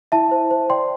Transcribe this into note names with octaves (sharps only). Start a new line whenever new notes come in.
E4 E5 A5
C5
C5
D5 G5 C6